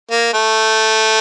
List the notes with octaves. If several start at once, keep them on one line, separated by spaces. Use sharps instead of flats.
A#3
A3